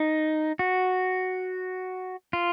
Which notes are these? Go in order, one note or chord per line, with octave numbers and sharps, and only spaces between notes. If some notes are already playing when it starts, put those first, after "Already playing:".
Already playing: D#4
F#4
F4